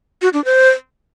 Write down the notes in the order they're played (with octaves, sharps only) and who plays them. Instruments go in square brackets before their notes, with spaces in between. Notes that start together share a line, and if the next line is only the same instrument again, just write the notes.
[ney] F#4
D4
C5